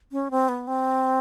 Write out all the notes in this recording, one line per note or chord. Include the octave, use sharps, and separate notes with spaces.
C#4
C4
B3
C4